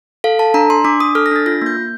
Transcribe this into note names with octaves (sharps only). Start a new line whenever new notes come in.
A4 F5
A4 A5
D4 A#5
D4 C6
D4 D6
D4 D#6
A4 F6
A#6
D4 A6
F4 A#6
A#3 G6
A#3